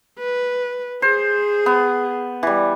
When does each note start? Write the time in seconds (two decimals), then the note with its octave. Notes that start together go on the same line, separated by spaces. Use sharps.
0.19 B4
1.02 G#4 C5
1.66 B3
2.43 E3 G3